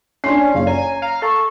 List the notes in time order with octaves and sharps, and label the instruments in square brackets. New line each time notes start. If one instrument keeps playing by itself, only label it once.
[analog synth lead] C#4 [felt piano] D4 C6 C7
[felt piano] F#1 [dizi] F5
[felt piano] C#5 [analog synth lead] G#5 [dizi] A#5
[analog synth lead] F5 [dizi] A#5
[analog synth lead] A4 [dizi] C#6